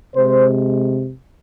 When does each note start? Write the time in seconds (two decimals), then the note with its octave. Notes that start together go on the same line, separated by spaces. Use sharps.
0.16 C3 G#3 C5